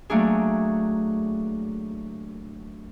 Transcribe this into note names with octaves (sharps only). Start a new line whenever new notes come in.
F#3 A3 A#3 D4 G#4